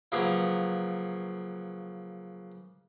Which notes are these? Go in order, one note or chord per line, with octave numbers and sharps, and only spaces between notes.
C#3 F3 F#3 A#3 A#4 B4